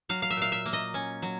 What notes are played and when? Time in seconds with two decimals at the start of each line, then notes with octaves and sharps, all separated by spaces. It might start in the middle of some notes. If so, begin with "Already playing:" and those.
0.09 F#3 F5
0.22 F5
0.30 E5
0.37 A#2
0.42 F5
0.52 E5
0.66 A#3
0.73 D#5
0.94 C#4
1.22 F#3